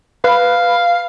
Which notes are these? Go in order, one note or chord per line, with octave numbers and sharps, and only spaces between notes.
B4 F5